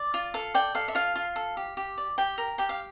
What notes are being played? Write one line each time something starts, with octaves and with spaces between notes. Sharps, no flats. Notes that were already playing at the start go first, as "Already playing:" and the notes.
Already playing: D5
F4
A4 F5
D5 G5
A4 F5
E5
F4 F5
F4
A4
G4
G4
D5
G4 G5
A#4
G4 G5
F5